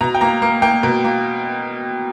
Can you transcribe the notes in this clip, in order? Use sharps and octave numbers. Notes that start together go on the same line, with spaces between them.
B2 A#5
G5
A#3 A#5
A#3
A#3 G5
B2 A#4
A#3